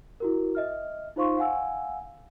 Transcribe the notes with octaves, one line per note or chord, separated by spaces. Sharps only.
E4 F#4 A#4
D#5 E5 F6
D#4 F4 C5 F5 C6 C#6
F5 F#5 G#5 E6